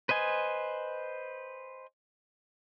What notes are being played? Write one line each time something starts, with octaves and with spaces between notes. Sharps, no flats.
B4 C5 D#5 G#5